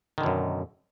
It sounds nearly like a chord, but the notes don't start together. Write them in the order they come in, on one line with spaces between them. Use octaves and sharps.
D#3 D3 B2 F#2